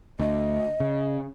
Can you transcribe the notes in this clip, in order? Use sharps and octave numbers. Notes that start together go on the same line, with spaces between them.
D2 D#5
C#3